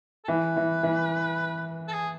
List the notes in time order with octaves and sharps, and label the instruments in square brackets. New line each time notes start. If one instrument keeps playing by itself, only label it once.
[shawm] A4
[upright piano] E3 [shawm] B4
[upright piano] E3
E3
[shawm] A4
G#4